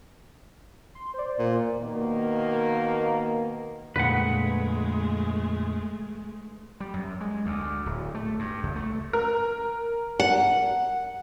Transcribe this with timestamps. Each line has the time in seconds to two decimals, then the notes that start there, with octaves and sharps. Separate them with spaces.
0.95 C6
1.14 C5 D5
1.39 A#2
1.81 B2 D#3 A#3
3.96 F2 A#2 D3 G#3 A3 B4 F#5
6.80 G3
6.94 F#2
7.21 G#3
7.46 D2
7.86 D1
8.15 A3
8.39 G2
8.63 C#2
8.76 A3
9.13 A#4
10.20 F#5